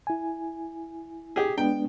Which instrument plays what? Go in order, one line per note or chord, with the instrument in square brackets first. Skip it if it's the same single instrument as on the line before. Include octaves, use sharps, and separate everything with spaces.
[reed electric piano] E4 G#5
[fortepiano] G4 G#4
[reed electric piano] G#3 B3 D4 [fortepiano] G5